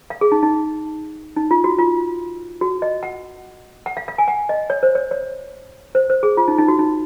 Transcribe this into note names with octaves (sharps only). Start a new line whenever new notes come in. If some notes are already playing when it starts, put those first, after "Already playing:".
F5
G#4
D#4
D#4
D#4
F4
F#4
F4
F#4
D#5
F#5
F#5
F5
F5
G#5
F#5
D#5
C#5
C5
C#5
C#5
C5
C5
G#4
F4
D#4
D#4
F#4
D#4